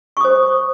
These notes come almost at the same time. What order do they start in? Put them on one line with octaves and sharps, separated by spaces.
C#6 D#6 C5